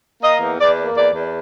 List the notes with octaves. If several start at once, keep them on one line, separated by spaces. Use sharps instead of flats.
A#3 D#5
E2
E2 D5
A#3
E2 D5
E2